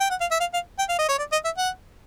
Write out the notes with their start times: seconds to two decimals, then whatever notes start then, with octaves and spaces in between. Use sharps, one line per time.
0.01 G5
0.10 F#5
0.21 F5
0.31 E5
0.40 F5
0.54 F5
0.79 G5
0.89 F5
0.99 D#5
1.09 C#5
1.19 D5
1.32 D#5
1.45 E5
1.58 F#5